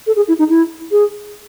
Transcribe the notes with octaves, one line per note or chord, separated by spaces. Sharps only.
A4
G#4
E4
D#4
E4
G#4